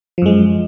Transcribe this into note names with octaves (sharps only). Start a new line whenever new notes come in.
F#2 F3 G#3